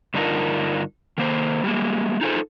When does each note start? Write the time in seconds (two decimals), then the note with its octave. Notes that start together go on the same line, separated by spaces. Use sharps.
0.14 G2 D3 D4 D#4 F4 A#4
1.18 D#3 A#3 C5
1.64 G3 G#3 A#3
2.21 D#4 F4 G#4 A4 C5